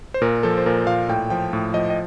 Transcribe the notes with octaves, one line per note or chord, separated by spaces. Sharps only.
C5
A#2 A#4
F3 A4
C5
A#2 A#4
A#2 F5
A2 G5
F3 G5
A2
F3 D#5
D#5